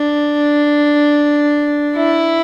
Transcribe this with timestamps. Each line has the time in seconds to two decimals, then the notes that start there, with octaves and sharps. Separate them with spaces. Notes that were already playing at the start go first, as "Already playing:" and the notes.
Already playing: D4
1.95 E4